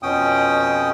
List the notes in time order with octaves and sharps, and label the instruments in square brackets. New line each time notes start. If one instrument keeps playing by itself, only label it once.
[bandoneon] F2 B2 C#4 G5 D#6